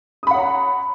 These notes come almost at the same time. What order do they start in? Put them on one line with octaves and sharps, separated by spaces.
D#6 B5 F#5 C#5 A#5